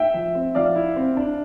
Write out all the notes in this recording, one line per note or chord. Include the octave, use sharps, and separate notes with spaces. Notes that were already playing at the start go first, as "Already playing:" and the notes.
Already playing: E5 G5
F3
C4
F3 D5 F5
E4
C4
D4